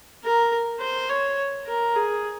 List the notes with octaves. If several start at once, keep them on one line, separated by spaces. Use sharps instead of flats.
A#4
C5
C#5
A#4
G#4